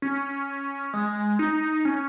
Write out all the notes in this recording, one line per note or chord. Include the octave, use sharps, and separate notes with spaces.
C#4
G#3
D#4
C#4